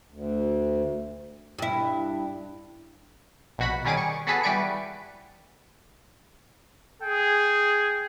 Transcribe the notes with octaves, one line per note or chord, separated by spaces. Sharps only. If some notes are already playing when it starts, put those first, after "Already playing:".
D2
G2 E4
A#1 B2 F#4 B5
D#3 G3 C#4 G#4 D6 D#7
C#6
B3 F#4 G#4 A4 B4
E3 G3 B4 D5 C#6 D7
G#4 G5